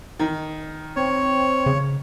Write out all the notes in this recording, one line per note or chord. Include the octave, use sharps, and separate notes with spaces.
D#3
C4 C#5
C#3